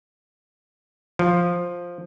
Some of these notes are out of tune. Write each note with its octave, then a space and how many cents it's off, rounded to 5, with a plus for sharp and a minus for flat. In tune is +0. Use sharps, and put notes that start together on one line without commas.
F3 +5